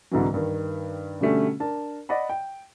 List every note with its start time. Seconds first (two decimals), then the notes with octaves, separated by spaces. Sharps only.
0.11 C2 G#2 D3 E3 F#3
0.34 G2 D#3
1.20 B2 D3 G3 A3 C#4
1.60 D4 A#4 A5
2.09 D5 D#5 F#5 B5
2.29 G5